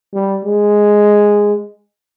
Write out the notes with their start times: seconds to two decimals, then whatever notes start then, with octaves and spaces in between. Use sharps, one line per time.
0.14 G3
0.45 G#3